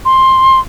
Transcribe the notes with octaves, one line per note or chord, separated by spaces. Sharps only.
C6